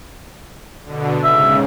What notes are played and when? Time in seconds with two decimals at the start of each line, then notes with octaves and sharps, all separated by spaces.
0.85 B2 D3
1.24 G#2 C#3 E5